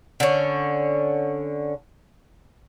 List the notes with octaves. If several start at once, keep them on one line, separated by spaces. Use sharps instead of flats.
D3 C#4